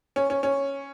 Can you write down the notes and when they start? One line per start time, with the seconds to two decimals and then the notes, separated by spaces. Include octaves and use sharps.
0.16 C#4
0.30 C#4
0.43 C#4